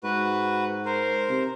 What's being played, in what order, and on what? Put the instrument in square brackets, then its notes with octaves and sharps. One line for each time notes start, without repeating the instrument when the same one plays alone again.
[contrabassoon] G#2 [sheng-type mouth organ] F#4 B4
[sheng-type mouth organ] A#4 C5
[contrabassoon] C3